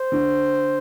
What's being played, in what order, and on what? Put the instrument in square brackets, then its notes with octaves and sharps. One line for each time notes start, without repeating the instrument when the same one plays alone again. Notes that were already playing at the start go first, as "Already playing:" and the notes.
Already playing: [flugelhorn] C5
[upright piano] D3 D4